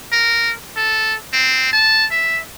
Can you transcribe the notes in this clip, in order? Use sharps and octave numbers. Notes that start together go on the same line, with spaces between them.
A#4
A4
C4
A5
E5